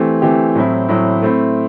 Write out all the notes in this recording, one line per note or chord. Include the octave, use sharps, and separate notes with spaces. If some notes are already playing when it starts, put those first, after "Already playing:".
Already playing: E3 A3 C4 G4
E3 A3 C4 G4
A2 F#3 C4 E4
A2 F#3 C4 E4
A3 C4 E4